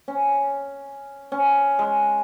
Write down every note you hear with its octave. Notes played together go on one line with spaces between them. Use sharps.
C#4
C#4
G#3